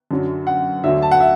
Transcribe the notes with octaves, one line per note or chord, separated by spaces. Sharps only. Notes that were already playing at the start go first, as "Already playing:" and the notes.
F#2 D3 F#3
F#5
D2 D3 F#3 E5
A5
F#5
E5